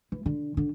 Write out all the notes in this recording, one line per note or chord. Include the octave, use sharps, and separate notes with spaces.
E3
D3
D3